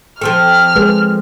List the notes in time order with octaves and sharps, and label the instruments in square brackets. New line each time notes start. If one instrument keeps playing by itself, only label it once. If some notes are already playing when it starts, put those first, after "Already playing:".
[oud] F3 C4 A4 [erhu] F6
[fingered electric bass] G#3 [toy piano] B4